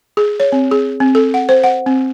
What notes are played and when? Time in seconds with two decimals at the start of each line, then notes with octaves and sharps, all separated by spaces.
0.17 G#4
0.40 C#5
0.52 C4
0.71 G#4
1.00 C4
1.15 A4
1.34 F#5
1.49 C5
1.64 F#5
1.86 C4